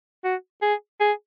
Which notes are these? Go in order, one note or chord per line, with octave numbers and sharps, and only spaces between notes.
F#4
G#4
G#4